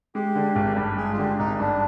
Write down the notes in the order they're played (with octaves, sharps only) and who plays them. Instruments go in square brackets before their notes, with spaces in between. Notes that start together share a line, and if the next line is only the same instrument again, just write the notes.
[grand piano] G#3 [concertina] G4
[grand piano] D3
G#1
G2
[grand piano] G#3 [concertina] G#4
[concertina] F4
[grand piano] D3 [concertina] G4
[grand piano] G#1 [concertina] D#4
[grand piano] G2 [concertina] D4